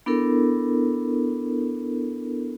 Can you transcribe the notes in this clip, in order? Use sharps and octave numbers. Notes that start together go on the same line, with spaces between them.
B3 D4 E4 A4 A#4